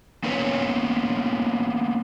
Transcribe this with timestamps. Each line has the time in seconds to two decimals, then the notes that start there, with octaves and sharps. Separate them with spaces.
0.24 A#3 B3 C#4 B4 C#5